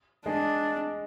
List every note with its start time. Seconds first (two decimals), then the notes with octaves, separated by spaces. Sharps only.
0.26 G#3 D4